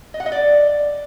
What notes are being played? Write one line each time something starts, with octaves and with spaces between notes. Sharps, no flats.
D#5
F#5
D#5
D5